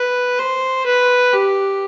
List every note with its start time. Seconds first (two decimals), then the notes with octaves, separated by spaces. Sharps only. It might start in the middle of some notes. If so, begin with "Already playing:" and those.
Already playing: B4
0.39 C5
0.86 B4
1.33 G4